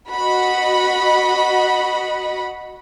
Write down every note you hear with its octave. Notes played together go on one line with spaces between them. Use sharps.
F#4 D#5 F#5 B5